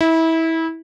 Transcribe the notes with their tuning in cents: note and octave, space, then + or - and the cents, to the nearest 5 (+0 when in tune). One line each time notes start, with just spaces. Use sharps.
E4 -25